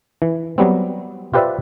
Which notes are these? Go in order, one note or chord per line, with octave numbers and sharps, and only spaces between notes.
E3
F#3 G3 B3 C4
F4 G4 B4 C5 D5 E5